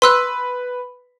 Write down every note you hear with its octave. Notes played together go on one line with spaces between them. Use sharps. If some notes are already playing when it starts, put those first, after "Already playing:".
B4 C6 E6 F#6